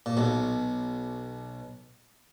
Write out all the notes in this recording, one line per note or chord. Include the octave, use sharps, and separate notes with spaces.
A#2
B1 B2